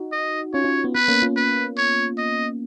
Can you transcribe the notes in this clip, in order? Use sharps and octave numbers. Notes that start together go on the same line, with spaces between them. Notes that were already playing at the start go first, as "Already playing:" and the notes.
Already playing: D#4 F#4
D#5
C#4 F4 C#5
C#4 F4
B3
B3 B4
A#3 C#4
C#4 F4
B4
C#5
D#5